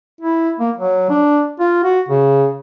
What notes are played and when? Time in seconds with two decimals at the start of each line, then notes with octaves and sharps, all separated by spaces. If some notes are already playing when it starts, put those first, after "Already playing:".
0.21 E4
0.60 A#3
0.77 F#3
1.10 D4
1.60 F4
1.84 F#4
2.09 C#3